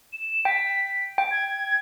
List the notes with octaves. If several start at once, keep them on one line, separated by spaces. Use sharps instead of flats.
E7
G5 B6
G5
G#6